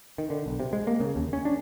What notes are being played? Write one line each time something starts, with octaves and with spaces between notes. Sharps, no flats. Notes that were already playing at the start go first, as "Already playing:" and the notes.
D#3
D3
B1
C3
G#3
A#3
C#3
D#2
C#4
D4